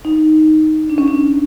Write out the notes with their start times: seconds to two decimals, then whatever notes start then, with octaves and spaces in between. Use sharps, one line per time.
0.05 D#4
0.90 D4
0.98 C#4
1.08 D4